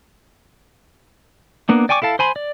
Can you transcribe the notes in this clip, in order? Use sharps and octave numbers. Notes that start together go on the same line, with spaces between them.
A#3 B3 D4
D5 G5 G#5 C#6 D6
E4 A4 F5 A5
C5 G#5 B5 C6
D5